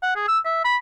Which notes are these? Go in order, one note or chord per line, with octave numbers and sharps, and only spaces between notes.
F#5
G#4
E6
E5
B5